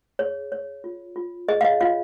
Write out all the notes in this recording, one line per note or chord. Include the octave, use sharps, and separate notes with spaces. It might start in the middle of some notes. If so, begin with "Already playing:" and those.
G#4 C#5
C#5
F4
F4
G#4 D#5
F5
D#5
F4 C#5 F5